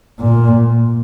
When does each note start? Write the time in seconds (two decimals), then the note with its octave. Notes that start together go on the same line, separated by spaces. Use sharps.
0.20 A#2